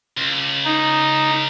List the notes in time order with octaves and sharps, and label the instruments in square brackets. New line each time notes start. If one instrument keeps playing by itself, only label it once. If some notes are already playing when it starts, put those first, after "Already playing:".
[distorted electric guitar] C#2
[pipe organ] D#4